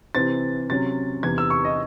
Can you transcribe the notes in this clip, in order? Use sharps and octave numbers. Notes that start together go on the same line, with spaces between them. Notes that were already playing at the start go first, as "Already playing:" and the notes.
C3 E3 C4 A6
C3 F#3 C#4 A6
E2 C3 E3 G#6
E6
C#6
D#5